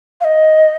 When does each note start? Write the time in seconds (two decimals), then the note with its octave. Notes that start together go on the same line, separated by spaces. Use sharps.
0.21 F5
0.24 D#5